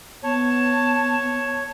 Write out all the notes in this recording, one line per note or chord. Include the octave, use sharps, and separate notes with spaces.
B3 C#5 A5